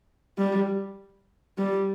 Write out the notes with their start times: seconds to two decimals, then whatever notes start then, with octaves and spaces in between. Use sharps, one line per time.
0.38 G3
1.58 G3